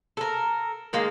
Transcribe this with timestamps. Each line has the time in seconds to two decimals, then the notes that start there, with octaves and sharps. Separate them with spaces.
0.17 A4 A#4
0.93 D#3 G#3 A#3